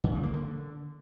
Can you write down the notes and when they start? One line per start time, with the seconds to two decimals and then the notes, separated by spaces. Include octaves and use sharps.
0.04 C#3
0.14 G2
0.23 A#3
0.33 D3